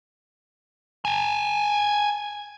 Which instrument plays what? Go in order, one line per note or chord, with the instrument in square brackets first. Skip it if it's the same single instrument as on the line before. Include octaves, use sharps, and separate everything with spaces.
[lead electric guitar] G5 G#5